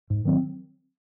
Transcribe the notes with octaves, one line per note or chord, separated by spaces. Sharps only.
G#2
D#3 F#3 C4